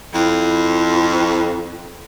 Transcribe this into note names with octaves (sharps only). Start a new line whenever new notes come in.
F2 E4